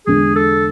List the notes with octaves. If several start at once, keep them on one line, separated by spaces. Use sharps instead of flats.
E2 D3 G#3 D4 G#4
A4